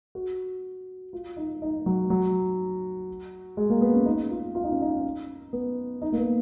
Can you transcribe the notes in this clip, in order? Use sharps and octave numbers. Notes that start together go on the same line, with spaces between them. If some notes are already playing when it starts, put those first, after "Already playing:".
F#4
F4
D#4
D#4
F#3
F#3
G#3
A#3
B3
C#4
D#4
F4
F4
D#4
C#4
D#4
B3
D#4
A#3
B3